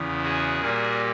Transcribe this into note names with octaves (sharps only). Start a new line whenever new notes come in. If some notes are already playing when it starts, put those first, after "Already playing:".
Already playing: E2 C#3 E3
F#4 G#4
A#2 G3 A#3